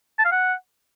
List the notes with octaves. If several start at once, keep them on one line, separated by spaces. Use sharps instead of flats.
A5
F5
F#5